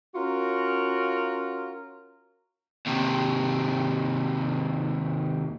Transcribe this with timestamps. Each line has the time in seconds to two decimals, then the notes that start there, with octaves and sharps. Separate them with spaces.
0.15 C#4 F4 F#4 A#4
2.87 D#2 C3